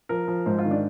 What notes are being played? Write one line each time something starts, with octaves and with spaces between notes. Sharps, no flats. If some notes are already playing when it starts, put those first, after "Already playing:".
F3 A#4
F3
G#2 C5
F4
D#3
D4